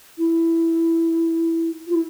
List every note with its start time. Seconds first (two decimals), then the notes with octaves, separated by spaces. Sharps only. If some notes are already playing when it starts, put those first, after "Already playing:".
0.18 E4
1.87 F4
1.94 E4